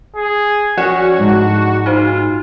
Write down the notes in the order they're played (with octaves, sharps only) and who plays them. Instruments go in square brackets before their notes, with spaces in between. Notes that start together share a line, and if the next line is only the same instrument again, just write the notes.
[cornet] G#4
[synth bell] F3 D5 [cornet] C#4 [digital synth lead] F#4
[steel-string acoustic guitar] G#2 [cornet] D4
[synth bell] D#4 F#4 C5 [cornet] F4